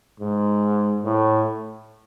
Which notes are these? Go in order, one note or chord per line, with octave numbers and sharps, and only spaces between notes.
G#2
A2